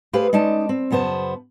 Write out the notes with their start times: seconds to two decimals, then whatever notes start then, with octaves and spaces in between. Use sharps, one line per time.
0.13 A3 G4 G#4 B4 C5 F5
0.33 G#3 C#4 D#4 D5 A5
0.69 C4
0.91 F#2 C#3 B3 C5 A5